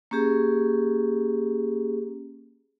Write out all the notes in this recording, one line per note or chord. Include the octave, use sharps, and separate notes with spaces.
A#3 C#4 G4 G#4